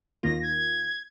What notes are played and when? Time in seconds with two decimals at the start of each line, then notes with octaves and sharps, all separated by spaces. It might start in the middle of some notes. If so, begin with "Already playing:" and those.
0.23 D#2 D#3 A#3 F4 A#6
0.43 G#6